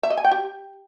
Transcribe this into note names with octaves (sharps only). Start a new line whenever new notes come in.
E5
D#5
G#5
G5
G4